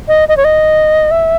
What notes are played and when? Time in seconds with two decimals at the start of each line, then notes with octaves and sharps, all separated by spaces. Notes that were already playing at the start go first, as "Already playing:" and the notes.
0.08 D#5
0.28 D#5
0.37 C#5
0.45 D#5
1.11 E5